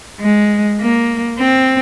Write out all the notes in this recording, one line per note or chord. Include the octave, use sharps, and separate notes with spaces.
G#3
A#3
C4